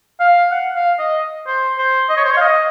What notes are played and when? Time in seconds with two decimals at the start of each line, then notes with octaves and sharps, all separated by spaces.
0.20 F5
0.51 F#5
0.75 F5
0.99 D#5
1.47 C5
1.78 C5
2.09 D#5
2.17 C#5
2.24 C5
2.33 C#5
2.37 F5
2.41 D#5